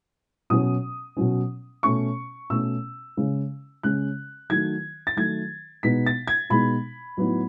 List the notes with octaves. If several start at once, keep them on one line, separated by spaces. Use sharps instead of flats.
B2 F#3 C#4 D#6
B2 F#3 C#4
B2 A3 C#4 C#6
B2 A3 C#4 E6
C#3 G#3 C#4
C#3 G#3 C#4 F#6
D#3 F#3 A3 G#6
A6
D#3 F#3 A3 G#6
B2 G#3 B3 D#4 B6
A6
G#6
B2 G#3 B3 D#4 B5
A2 F#3 B3 D#4